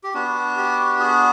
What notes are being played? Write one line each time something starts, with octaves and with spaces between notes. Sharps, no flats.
G4
B3 D4 F#4
G4
F#4 G#4